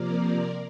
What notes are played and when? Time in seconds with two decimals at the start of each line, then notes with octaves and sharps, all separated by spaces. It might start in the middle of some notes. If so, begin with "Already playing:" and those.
Already playing: C3 F3 A#3 A#4 D5